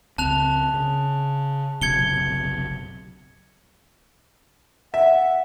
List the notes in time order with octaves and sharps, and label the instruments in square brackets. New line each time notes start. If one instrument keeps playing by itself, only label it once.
[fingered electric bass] C#2 C4 [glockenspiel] A5 F#6 F7
[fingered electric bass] C#3
[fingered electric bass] F#1 B1 C3 [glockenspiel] G#6 C#7 G7
[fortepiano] E5 [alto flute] F#5